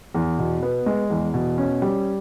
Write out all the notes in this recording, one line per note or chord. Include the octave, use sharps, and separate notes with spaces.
E2
B2
B3
G#3
E2
B2
C#4
G3